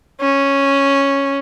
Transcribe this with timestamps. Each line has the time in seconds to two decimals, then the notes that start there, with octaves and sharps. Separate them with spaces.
0.21 C#4